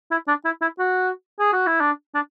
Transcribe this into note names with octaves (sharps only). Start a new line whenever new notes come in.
E4
D4
E4
E4
F#4
G#4
F#4
E4
D4
D4